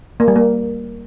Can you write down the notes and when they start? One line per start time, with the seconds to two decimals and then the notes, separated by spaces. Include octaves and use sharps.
0.20 A#3
0.28 G3
0.36 A#3